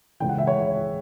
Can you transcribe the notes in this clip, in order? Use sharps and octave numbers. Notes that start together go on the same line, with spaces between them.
C#2 C#3 E3 G5
F#5
E5
C#5